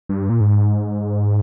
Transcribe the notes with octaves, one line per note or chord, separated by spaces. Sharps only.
G2
A#2
G#2